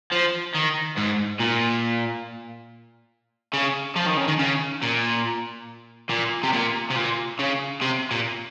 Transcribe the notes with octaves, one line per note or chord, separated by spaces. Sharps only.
F3
D#3
G#2
A#2
C#3
F3
D#3
C#3
D#3
C#3
A#2
A#2
C3
A#2
C3
A#2
C#3
C3
A#2